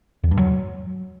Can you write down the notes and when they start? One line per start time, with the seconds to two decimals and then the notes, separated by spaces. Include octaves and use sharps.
0.24 E2
0.31 G2
0.39 F#3